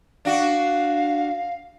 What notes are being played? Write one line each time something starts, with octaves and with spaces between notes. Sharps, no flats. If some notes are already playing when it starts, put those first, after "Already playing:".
D4 F#4 F5